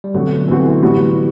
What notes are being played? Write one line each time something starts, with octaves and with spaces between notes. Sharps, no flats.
G3
B2 D3 F#3 A3 C4 F#4
B2 E3 A3 C4 F#4
E3
A2 G3 B3 F#4